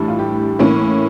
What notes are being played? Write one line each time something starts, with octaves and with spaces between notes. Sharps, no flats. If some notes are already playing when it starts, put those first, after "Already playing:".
Already playing: A2 E3 G3 D4
F4
G4
A2 E3 A#3 C#4